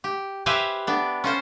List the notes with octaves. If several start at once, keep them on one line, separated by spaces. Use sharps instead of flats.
G4
G4 B4 C5 E5 F5 G#5
B3 D4
C#4 F4 C5